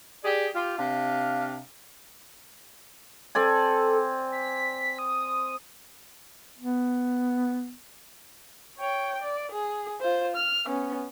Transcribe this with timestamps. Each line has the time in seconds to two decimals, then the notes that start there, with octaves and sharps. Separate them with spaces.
0.24 G4 G#4 D5
0.54 F4 G4
0.77 C3 D4 F5
3.35 C4 A4 D5 G#5
4.32 B6
4.99 D#6
6.58 B3
8.78 C#5 G5
9.22 D5
9.51 G#4
10.01 F4 C5
10.36 F6
10.66 B3 C#4